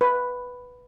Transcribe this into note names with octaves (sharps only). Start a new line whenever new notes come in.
B4